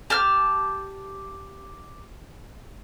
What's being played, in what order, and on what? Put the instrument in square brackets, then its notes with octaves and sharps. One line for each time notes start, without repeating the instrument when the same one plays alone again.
[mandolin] G4 A5 F6